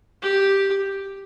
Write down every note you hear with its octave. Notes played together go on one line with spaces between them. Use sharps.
G4